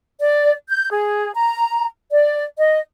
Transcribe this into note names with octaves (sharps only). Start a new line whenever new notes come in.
D5
G6
G#4
A#5
D5
D#5